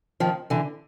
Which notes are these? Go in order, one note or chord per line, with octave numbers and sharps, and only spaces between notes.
D#3 F3
D3 E3